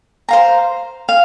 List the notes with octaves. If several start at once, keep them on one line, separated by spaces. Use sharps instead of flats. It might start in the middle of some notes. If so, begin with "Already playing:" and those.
C5 F5 A#5
F5